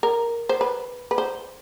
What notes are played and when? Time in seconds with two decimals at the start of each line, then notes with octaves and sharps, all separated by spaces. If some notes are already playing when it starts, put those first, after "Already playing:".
0.03 A#4
0.49 C5
0.61 B4
1.11 B4
1.18 C5